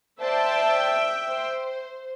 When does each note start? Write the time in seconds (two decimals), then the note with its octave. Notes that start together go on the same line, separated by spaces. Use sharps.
0.21 C5 D5 E5 G5 A5
1.28 C5